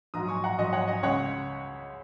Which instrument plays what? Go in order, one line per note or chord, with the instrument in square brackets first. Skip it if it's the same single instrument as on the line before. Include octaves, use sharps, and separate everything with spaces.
[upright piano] A#1 G#2 F#3 A#5 D#6
G#5 C#6
F#5 A#5
A#1 G#2 F#3 D#5
C#5 F#5
D#5 G#5
C#2 C#3 G#3 C#5 F#5